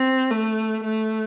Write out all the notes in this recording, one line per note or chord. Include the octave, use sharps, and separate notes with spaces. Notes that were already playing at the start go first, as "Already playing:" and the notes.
Already playing: C4
A3
A3